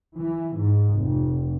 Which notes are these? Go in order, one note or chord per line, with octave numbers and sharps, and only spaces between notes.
E3
G#2
F1